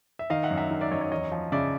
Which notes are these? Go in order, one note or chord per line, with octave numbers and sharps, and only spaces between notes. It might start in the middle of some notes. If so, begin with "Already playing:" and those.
E5
D#3 D#5 F5
E5 F#5
F#2
E5 F#5
D#3
D5 E5
F#2 C#5 D#5
C#5 D#5
E2 C#5 D#5
F3
C#3 D5 E5